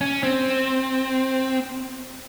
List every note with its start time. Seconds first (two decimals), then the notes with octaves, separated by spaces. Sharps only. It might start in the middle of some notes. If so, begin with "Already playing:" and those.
0.01 C#4
0.23 C4